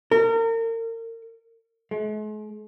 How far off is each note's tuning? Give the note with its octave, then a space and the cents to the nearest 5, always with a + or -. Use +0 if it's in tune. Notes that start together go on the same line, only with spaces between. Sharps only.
A#4 -35
G#3 +45